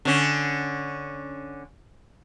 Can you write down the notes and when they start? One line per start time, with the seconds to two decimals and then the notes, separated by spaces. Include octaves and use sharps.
0.05 D3 C#4